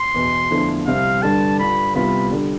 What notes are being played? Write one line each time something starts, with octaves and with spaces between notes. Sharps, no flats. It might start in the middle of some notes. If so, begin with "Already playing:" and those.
Already playing: C6
E2 B2 B3
E2 D3 F3 A3 E4
C2 C3 G3 C4 F5
G2 D3 G3 D4 A4 A5
G2 D3 G3 D4 F4 B5
C2 C3 G3 B3 F4 B5
D3 G3